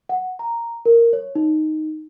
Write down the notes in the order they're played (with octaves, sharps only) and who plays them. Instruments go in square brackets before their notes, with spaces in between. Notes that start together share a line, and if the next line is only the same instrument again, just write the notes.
[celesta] F#5
A#5
A#4
C#5
D#4